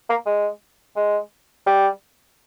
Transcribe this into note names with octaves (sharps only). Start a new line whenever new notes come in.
A#3
G#3
G#3
G3